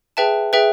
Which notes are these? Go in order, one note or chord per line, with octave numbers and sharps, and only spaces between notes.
G#4 B4 E5 G5 A5
G#4 B4 E5 G5